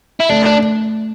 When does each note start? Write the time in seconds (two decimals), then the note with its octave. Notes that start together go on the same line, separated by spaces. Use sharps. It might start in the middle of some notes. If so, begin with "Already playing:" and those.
0.20 E4
0.29 A3 D4
0.46 D4